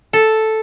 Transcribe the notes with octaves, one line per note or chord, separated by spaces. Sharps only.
A4